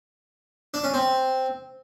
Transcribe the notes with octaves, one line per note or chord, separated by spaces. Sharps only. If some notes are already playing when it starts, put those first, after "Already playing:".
D4
C#4
C4